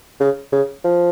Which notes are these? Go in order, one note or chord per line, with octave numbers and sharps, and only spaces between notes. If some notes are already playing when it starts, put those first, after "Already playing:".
C#3
C#3
F3